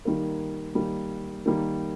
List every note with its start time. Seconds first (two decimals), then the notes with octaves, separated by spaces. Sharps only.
0.05 D#3 G3 A#3
0.75 D#3 G3 A#3
1.46 D#3 G3 A#3